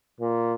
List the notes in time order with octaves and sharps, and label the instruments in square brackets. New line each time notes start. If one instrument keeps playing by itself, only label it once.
[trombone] A#2